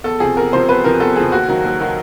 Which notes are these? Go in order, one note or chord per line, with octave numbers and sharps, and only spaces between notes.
E2 A4
C3 F3 G#4
E2 A#4
C3 F3 C5
E2 B4
C3 F3 A#4
E2 A4
C3 F3 G#4
D#2 F#4
D#3 F#3
D#2
D#3 F#3